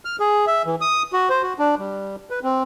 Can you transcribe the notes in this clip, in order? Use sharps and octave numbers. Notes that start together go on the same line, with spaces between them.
F6
G#4
E5
E3
D#6
F#4
C5
F#4
D4
G3
B4
C4